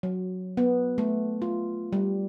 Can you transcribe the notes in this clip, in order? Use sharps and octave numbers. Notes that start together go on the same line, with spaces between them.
F#3
B3
A3
F4
G3